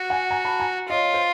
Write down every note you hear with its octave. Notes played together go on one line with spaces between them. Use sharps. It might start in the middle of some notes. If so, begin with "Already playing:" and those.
Already playing: F#4
F#5 G#5
G#5 A#5
A5 B5
G#5 A#5
F4 C#5 D#5
C5